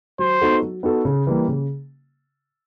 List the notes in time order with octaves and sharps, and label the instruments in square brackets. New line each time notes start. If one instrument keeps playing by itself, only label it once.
[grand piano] F#3 [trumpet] C5
[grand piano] B3 D#4 F#4 A4
F#3
B3 D#4 F#4 A4
C#3
E3 G3 A#3
C#3